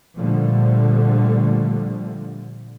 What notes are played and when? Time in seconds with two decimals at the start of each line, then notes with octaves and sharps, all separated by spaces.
0.17 A#2 D3 F3 G3 A3